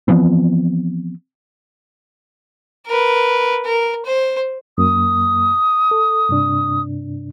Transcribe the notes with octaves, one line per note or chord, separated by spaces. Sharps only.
E3 F3 B3 C4
A#4 B4
A#4
C5
F#2 A#3 D#6
A4
G2 C3 D4